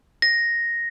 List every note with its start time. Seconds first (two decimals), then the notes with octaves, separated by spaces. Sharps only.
0.22 A#6